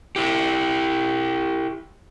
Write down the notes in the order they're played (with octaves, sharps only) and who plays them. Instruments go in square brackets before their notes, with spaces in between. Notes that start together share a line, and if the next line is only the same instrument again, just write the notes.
[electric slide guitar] E4 G4